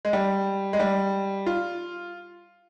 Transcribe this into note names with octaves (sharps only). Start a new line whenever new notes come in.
G#3
G3
G#3
G3
F4